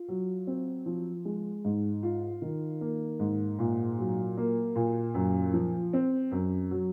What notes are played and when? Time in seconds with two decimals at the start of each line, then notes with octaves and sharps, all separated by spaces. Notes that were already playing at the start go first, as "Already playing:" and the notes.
Already playing: F4
0.08 F#3
0.47 C4
0.86 F3
1.25 G#3
1.65 G#2
2.03 F4
2.42 D#3
2.81 A#3
3.20 G#2
3.59 A#2
3.98 F#3
4.37 A#3
4.76 A#2
5.14 F#2
5.54 F3
5.93 C4
6.32 F#2
6.71 F#3